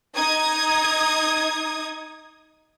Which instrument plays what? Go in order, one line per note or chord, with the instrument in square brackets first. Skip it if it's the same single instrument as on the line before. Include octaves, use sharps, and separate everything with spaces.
[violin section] D#4 D#6 G#6